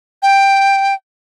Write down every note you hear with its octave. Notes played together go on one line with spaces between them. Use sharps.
G5